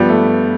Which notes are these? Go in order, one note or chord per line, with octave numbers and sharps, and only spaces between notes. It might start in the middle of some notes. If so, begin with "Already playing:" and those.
Already playing: G2 F3 G3 B3
A3